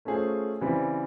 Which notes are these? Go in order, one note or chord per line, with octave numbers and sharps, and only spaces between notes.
A3 C#4 F4 G#4 C5
C#3 E3 G3 C4